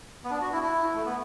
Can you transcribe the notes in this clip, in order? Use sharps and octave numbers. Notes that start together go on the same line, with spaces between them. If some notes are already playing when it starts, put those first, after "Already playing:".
B3
D4
F#4
E4
E4
A3
B3